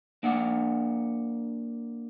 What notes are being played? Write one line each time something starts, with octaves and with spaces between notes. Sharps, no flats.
A#3 D4 F#5